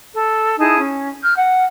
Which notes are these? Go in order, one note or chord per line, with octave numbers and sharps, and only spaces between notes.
A4
D#4 E4 G#4 A5
C#4
F6 G6
F#5